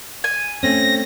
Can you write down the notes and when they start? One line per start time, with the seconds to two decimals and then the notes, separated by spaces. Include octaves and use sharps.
0.24 G#5
0.63 A3 C4 C#4 A#6